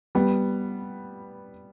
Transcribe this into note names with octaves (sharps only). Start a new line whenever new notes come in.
G3 B3